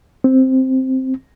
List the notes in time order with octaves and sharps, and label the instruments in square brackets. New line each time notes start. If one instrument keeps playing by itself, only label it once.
[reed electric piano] C4